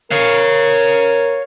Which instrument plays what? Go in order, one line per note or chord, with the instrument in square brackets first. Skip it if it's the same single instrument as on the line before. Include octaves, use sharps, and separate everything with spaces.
[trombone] A#4 [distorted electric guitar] C#5 F5